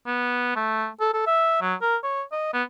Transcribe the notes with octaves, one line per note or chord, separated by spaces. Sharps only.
B3
A3
A4
A4
E5
F#3
A#4
C#5
D#5
B3